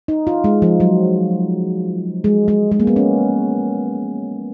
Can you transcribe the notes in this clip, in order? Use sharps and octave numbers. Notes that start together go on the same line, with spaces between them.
D#4
F4
G#3
F3
F#3
G#3
G#3
G#3
A#3
B3
C#4